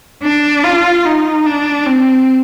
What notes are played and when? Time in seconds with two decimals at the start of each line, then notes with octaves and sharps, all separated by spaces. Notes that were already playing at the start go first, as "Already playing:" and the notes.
0.23 D4
0.64 F4
1.05 D#4
1.46 D4
1.87 C4